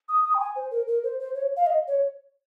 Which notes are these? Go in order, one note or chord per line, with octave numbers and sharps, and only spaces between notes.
D#6
D#6
G5
G#5
C5
A#4
A#4
C5
C5
C#5
F5
D#5
C#5